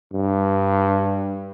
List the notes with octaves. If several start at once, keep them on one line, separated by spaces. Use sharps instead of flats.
G2